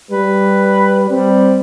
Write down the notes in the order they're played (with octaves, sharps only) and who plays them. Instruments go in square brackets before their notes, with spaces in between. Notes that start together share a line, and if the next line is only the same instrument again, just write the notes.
[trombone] G3 [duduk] B4
[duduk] G3 [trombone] C4